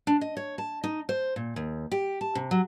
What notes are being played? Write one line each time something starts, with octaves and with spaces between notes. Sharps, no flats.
D4
D#5
C#5
A5
D#4
C5
A#2
D#2
G4
A5
C3
F#3